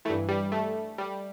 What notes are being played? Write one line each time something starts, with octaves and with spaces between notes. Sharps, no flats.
G2 E3 A3
G3
A3
G3